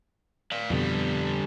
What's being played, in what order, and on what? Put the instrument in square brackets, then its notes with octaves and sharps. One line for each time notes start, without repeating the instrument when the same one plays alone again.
[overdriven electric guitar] D5 F5
[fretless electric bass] F2 B2 [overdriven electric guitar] D3 G3